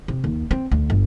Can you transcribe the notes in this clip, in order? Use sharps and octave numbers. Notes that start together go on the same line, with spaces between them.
C3
D#2
C4
D2
G1